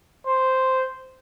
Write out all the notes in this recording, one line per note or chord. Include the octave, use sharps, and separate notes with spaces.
C5